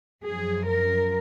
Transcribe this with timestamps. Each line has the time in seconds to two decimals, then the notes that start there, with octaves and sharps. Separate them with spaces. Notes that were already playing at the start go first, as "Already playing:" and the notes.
0.24 F#2 F3 G#4
0.69 A#4